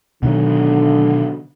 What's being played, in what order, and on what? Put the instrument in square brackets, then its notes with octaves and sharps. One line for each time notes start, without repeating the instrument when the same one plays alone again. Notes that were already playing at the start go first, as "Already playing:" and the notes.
[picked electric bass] B2 D#3 F#3 [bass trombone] D3